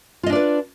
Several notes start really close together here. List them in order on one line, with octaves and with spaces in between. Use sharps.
F4 D#5 D4 D5 B4